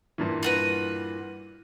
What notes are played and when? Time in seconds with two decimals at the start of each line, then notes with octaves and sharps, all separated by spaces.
0.18 G2 A#2 E3
0.43 F4 F#4 B4